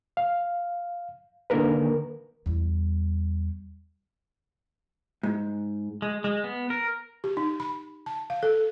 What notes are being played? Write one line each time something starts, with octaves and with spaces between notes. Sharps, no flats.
F5
D3 D#3 A#3 A#4 B4
E2 G3
G#2
G#3
G#3
B3
A#4
G4
D#4
B5
A5
F5
A4